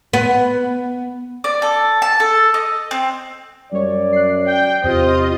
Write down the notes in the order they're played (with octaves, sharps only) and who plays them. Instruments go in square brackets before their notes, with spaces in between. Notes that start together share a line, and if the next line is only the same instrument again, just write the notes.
[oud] B3
[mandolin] D5
A4
A5
A4
D#5
C4
[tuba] F#2 [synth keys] G3 C#5 [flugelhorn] D5
[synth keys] F#6 C7
[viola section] G5
[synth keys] E2 [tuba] C3 [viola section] F4 D#5 [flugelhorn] C5